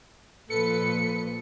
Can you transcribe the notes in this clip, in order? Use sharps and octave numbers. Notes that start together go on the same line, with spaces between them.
A#2 F3 A4 B4 C#7